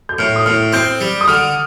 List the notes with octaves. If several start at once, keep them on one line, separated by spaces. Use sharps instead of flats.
G6
A2 F6
D#6
A2 F6
C4 G6
G3
D#6
D3 F6